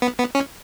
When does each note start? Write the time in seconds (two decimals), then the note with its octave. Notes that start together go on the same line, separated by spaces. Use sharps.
0.02 B3
0.19 B3
0.35 C#4